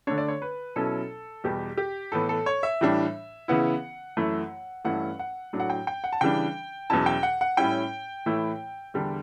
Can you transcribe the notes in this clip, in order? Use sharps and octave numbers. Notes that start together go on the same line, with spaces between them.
D3 A3 D4 C#5
D5
C#5
B4
B2 F#3 C#4 E4 A4
E2 B2 G3 G4
G4
A2 E3 B3 A4
A4
C#5
E5
A2 E3 G3 D4
C#3 E3 B3 E4 F#5
F#2 E3 A3 E4
G2 E3 A3 C#4 E4 F#5
F#5
A2 F#3 A3 D4
F#5
G5
G5
F#5
A5
C#3 E3 G3 D4 G5
E2 B2 F#3 C#4 E4 A5
G5
F#5
F#5
A2 G3 C#4 E4 G5
A2 E3 A3 E4
E2 D3 G3 D4